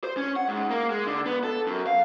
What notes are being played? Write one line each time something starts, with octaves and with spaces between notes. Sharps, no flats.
C5
C#4
F#5
G#2
A#3
G#3
D3
B3
A4
F#2
F5